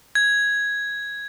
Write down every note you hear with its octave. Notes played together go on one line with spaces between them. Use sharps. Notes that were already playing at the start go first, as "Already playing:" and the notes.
G#6